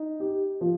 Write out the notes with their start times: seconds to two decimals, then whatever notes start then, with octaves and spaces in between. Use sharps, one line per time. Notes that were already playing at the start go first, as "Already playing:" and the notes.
Already playing: D#4
0.20 G4
0.61 F3